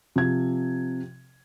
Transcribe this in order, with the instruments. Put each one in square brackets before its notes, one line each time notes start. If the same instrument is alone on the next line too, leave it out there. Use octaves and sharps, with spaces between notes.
[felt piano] C3 F3 G#6